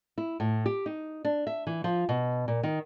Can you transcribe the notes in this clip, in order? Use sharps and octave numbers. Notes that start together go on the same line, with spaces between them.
E4
A2
G4
D#4
D4
E5
E3
F3
B2
A#2
D#3